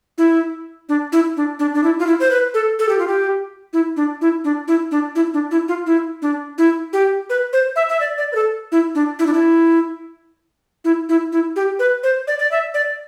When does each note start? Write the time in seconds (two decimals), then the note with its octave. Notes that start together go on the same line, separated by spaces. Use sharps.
0.18 E4
0.89 D4
1.12 E4
1.37 D4
1.59 D4
1.74 D4
1.84 E4
1.99 F4
2.07 E4
2.20 C5
2.31 B4
2.54 A4
2.79 A4
2.89 G4
2.99 F4
3.08 G4
3.73 E4
3.97 D4
4.21 E4
4.44 D4
4.68 E4
4.91 D4
5.16 E4
5.34 D4
5.51 E4
5.68 F4
5.86 E4
6.22 D4
6.58 E4
6.93 G4
7.30 B4
7.53 C5
7.76 E5
7.89 E5
8.00 D5
8.18 D5
8.32 B4
8.35 A4
8.72 E4
8.95 D4
9.19 E4
9.26 D4
9.34 E4
10.85 E4
11.09 E4
11.32 E4
11.56 G4
11.79 B4
12.03 C5
12.27 D5
12.39 D5
12.51 E5
12.74 D5